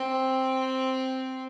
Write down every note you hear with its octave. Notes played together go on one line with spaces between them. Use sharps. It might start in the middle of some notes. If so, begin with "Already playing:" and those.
Already playing: C4